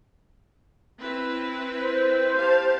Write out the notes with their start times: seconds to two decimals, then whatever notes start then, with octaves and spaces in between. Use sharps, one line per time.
1.00 C4 E4 B4
1.81 C5
2.38 G4 F5 A5